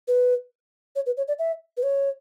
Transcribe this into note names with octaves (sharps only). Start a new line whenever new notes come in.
B4
C#5
B4
C#5
D5
E5
B4
C#5